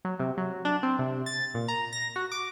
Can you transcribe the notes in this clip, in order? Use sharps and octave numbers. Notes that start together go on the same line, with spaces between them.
F#3
C3
F#3
D4
C4
C3
A6
A#2
A#5
A#6
F#4
D6